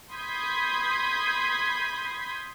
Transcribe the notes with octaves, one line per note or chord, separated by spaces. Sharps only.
B5 C6 D#6 G6 G#6 B6